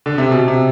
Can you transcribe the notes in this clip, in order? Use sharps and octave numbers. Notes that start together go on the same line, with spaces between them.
D3
C3
B2
C3